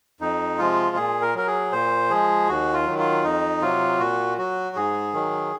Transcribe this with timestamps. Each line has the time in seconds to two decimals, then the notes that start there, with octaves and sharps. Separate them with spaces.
0.21 F2 D#4
0.58 C3 F3 G#3 F4
0.96 A#2 G#4
1.22 A#4
1.35 F#3 A#4
1.47 G#4
1.72 A#2 C5
2.10 F3 G#3 G#4
2.48 D#2 F#4
2.74 F4
2.86 D#3 F#3
2.99 F4
3.24 F2 D#4
3.62 C3 F#3 F4
3.99 A#2 F#4
4.38 F#3 F#4
4.76 G#2 G#4
5.14 D#3 F#3